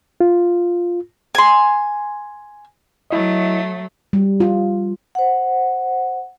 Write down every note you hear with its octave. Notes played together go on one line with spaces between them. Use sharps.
F4
G#5 C6
F#3 A3 E4 D#5
G3
F4
C5 F#5